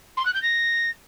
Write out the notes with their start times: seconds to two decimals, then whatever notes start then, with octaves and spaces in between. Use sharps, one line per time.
0.17 C6
0.25 F#6
0.34 G6
0.42 A#6